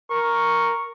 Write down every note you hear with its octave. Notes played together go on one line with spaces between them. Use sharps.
A#4 C#6